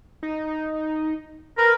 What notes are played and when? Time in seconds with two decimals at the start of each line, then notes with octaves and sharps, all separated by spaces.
0.23 D#4
1.58 A#4 B4